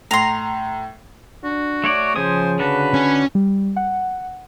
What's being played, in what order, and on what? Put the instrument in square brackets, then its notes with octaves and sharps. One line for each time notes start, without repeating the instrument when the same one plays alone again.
[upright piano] A2 [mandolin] A#5 C6
[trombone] D4 [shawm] F#4
[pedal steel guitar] A3 C#5 D5
[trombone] C#3 [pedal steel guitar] F3 G#5 D#6 [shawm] C5
[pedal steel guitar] D3 F#4 A4 [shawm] B4
[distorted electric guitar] C#4
[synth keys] G3
F#5